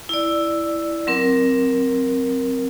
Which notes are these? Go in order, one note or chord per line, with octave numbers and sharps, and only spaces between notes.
E4 D5
F#3 C4 A#4